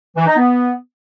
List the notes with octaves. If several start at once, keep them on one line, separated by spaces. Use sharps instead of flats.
E3
D#4
B3